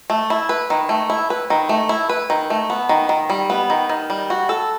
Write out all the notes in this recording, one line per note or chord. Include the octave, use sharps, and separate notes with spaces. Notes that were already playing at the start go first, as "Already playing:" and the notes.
A3
E4
B4
D#3
A3
E4
B4
D#3
A3
E4
B4
D#3
A3
B3
D#3
D#3
G3
B3
D#3
D#3
G3
F#4
A4